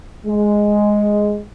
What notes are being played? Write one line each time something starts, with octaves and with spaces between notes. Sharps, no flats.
G#3